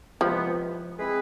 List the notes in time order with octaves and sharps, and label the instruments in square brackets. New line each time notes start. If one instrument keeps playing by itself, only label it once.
[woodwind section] C3 E3 G#3 B3 [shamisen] F3
[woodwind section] E3 G#3 C4 G#4 B4